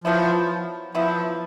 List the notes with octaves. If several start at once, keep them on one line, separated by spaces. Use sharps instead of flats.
F3 F#3 B3 E4
F3 F#3 B3 E4